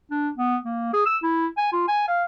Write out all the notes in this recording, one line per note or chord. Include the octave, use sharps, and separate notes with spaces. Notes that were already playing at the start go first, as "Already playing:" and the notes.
D4
B3
A#3
G#4
E6
E4
G#5
F4
G#5
F5